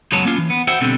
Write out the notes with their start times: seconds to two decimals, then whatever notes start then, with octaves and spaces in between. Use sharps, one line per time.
0.12 C#2 F#2 F#3 B3 C#5 A5
0.25 A#3 C#4 F4
0.38 E3
0.50 B3
0.68 F#4 C5 E5 F#5 G5
0.81 B2 D3 G3 C4